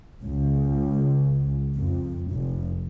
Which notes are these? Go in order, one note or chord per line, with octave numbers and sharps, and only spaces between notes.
C#2
F2
F1